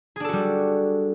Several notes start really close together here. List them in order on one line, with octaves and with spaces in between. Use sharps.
G#4 D4 A4 F#4 G3